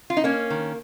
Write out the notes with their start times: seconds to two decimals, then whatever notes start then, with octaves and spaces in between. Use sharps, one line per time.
0.10 F4
0.17 D#4
0.24 A#3 C#4
0.50 D#3